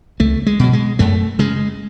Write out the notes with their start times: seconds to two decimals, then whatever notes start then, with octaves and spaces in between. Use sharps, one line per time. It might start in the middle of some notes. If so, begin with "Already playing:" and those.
0.20 C#2 A3
0.46 G#3
0.59 B2 F#3
0.73 G#3
0.99 F#2 A3
1.39 C#3 G#3